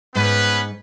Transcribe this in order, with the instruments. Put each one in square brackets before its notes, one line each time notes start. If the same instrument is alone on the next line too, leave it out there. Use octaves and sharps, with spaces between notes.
[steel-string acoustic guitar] G#2 [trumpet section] B3 C#4 B4